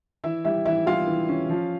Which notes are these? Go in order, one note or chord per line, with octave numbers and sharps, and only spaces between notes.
E3 E4 E5
G3 E4 E5
E3 E4 E5
G3 F4 F5
E3
C#4
F3